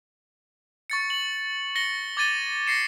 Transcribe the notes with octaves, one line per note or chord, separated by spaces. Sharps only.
C#6 A6 C#7
F#7
A#6 C#7 G7
D6 G#6 A6 D#7 G7
A#6 C7 C#7 E7